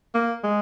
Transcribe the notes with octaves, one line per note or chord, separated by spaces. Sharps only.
A#3
G#3